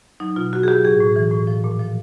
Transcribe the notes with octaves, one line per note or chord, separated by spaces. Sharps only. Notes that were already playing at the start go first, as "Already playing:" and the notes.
F#3 D#4
B2 F4
F#3 F#4
G#4
F#3 G4
A2 G#4
A2
E3
A2
F3
A#2
F3